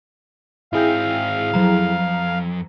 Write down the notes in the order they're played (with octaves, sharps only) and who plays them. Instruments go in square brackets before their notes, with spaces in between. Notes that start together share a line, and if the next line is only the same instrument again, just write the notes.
[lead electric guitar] G#2 C4 [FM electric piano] E4 G#4 G5 [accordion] F5
[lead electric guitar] C2 F2 [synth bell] F#3 A#5